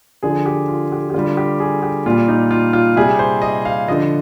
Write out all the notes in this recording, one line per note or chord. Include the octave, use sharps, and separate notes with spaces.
D3 F3 G#4
G4
F4
G4
G4
D3 G3 F4
G4
G#4
G4
A#2 G3 F4
D#4
F4
F4
C3 G3 G#4
C5
D#5
F5
D3 F3 D#5